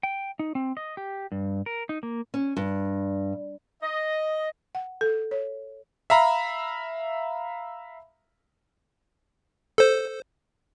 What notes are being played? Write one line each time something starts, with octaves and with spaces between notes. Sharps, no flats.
G5
D#4
C4
D#5
G4
G2
A#4
D#4
A#3
C#4
G2
D#5
F#5
A4
C#5
E5 F5 A#5 B5
A4 C5